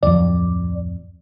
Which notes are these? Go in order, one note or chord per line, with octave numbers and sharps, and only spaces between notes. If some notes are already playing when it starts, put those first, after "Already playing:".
D1 F2 D5